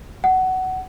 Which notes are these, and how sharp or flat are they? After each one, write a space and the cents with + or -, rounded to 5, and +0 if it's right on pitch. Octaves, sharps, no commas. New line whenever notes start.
F#5 +15